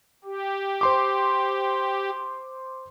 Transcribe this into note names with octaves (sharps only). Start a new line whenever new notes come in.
G4
C5 C6 D6